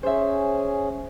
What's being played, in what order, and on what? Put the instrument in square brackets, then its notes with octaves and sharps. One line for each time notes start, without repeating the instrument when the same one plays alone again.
[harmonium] C#4 G#4 [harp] C5 E5